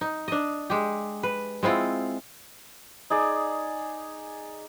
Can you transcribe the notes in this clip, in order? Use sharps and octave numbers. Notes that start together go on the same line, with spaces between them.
D#4
D4 D#5
G#3 G4
B4
G#3 C4 E4 F4
D#4 G#4 D5